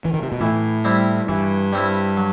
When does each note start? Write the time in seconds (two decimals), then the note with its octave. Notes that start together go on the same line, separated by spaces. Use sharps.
0.05 E3
0.13 D#3
0.22 C3
0.32 B2
0.40 A2 E3
0.85 G3 C4 E4
1.28 G2 E3
1.73 G3 C4 E4
2.17 F#3